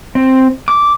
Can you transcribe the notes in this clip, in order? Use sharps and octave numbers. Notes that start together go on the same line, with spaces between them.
C4
D6